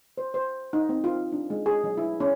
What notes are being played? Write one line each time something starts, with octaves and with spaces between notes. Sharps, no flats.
C5
C5
D#4
C4
F4
D4
G#3
G#4
F#3
E4
C#4